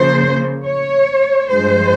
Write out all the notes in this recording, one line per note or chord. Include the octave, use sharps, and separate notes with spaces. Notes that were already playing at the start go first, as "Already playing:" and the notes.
Already playing: C#3 F3 A#3 C5
C#5
G2 F3 G#3 C5